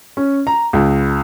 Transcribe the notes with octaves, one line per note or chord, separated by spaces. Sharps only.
C#4
A#5
C#2